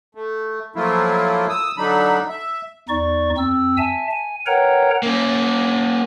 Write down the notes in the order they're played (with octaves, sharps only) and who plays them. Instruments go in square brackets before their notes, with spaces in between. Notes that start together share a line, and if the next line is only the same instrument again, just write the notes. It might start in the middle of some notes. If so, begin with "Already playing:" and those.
[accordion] A3
F3 F#3 A3 A#3 E4 F4
D#6 E6
D3 F#3 D4 D#4 B5
E5
[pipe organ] E2 D#4 D5 C#6
F2 C4 E6
E5 G#5 A5
G#5
A#4 B4 C#5 F#5 G5 A#5
[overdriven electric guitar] A#3 C#4